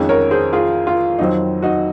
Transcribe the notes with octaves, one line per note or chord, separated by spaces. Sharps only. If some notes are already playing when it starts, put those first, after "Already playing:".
Already playing: F2 D#3 G#3 C#4
A#4 C#5
G#4 C5
F4 G#4
F4
F2 D#3 F#3 C4 D#4
D#4 F#4